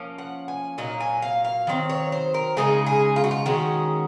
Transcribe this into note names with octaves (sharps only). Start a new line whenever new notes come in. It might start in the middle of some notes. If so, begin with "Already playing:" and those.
Already playing: F3 A#3 C#4
F#5
G#5
A#2 F#3 A#3 D#4
G#5
F5
F5
D#3 F#3 C4
C#5
C5
A#4
C#3 G#3 C4 D#4 G#4
G#4
F4
F#4
F4
D#3 G#3 C#4 F#4